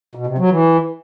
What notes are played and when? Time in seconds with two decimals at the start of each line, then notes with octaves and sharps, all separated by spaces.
0.15 B2
0.27 C3
0.38 F#3
0.50 E3